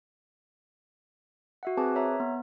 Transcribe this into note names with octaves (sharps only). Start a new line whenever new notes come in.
F#4 E5 F#5
C4 G#4 B4 G#5 A5 D6
A#4 C#5 E5 A#5
B3